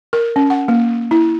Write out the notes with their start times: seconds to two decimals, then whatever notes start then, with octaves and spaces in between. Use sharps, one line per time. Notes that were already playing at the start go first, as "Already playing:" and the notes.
0.13 A#4
0.36 C#4
0.50 F#5
0.68 A#3
1.11 E4